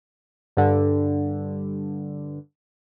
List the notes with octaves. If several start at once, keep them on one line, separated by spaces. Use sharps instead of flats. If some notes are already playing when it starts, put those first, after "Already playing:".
G2 D3